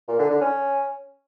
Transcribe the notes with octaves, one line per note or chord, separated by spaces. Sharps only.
A#2
D3
D3
C#4